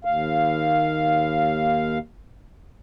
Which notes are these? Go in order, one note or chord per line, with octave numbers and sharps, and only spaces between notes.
D#2 F5